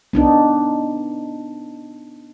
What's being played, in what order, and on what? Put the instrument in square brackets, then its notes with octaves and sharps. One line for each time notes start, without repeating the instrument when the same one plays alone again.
[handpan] B3 D4 D#4